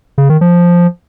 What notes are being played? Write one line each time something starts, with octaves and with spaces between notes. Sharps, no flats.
C#3
D#3
F3